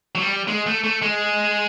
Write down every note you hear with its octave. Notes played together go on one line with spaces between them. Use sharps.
F#3
G3
G#3
A3
A3
G#3